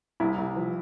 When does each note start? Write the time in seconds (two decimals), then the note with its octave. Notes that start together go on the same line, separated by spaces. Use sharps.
0.20 C2 E4
0.38 C2
0.56 F3